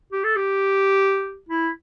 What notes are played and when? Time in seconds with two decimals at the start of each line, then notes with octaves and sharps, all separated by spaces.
0.12 G4
0.24 A4
0.36 G4
1.49 E4